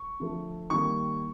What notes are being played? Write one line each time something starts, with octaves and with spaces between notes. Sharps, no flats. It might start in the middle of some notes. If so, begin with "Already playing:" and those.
Already playing: C#6
D3 F3 A3
D#3 G3 A#3 C#6